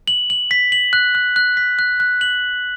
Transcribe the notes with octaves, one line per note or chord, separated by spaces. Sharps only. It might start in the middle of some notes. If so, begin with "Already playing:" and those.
F#7
F#7
B6
F#7
F#6
F#6
F#6
B6
F#6
F#6
F#7